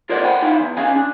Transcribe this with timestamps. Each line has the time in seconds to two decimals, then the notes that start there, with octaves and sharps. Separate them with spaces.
0.09 F4 A#4 C5 D5 D#5 F#5
0.24 F#5 G5 B5
0.42 D#4 E4 F5
0.60 E2
0.77 C#4 D#5 F5 G#5
0.96 D4